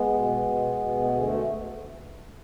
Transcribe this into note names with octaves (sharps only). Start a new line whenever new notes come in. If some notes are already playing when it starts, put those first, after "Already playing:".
Already playing: G#3 B3
B2
B2
B2
A3
D2 G#3
A3